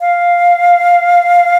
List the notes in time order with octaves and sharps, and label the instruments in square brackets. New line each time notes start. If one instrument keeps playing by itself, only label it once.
[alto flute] F5